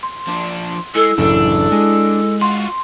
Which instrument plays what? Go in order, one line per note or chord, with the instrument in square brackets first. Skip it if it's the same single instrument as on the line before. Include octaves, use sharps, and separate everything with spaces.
[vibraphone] C6
[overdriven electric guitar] F3 D4
[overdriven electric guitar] G#3 [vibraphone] E4 [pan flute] A4
[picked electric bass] A1 F#2 C#3 [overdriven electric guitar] D4 [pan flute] A4
[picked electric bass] G#3
[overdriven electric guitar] F4 F#4 [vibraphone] C6